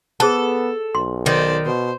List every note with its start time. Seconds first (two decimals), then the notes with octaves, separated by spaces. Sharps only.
0.20 B3 G#4 A4 C5 A5
0.95 B1 C6
1.26 D#3 C5 D5
1.66 B2 C5